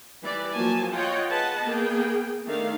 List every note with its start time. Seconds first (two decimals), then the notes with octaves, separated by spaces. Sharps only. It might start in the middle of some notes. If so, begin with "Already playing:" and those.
0.23 E3 G3 B4 D5
0.55 F3 F#3 A#3 F#4 G#5 A5
0.94 F4 C#5 D#5 F#5 G5
1.30 G#4 B4 D#5 F#5 A5
1.64 A#3 B3 G#4 G5
2.46 D#3 A3 D4 D#4 F5